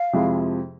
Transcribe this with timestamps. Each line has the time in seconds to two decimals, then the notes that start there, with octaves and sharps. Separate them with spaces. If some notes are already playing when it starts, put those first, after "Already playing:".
Already playing: F5
0.13 F2 C3 F3 G#3 E4